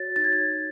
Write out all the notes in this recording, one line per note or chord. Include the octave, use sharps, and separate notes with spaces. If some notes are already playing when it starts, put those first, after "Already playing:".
Already playing: F#4 C#5 A6
D#4 A6
G#6
A6
C#5